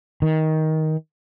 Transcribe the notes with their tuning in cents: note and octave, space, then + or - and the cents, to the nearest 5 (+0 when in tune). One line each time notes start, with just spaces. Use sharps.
D#3 +15